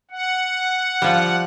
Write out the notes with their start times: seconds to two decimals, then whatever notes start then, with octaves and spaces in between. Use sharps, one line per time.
0.11 F#5
1.02 F3 G3